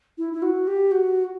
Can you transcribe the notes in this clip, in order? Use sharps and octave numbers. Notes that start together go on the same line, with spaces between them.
E4
E4
F#4
G4
F#4